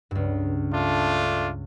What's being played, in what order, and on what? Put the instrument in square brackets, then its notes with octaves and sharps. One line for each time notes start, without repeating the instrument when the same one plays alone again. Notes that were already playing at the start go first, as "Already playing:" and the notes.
[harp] C#2 G2
[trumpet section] A3 D4 F4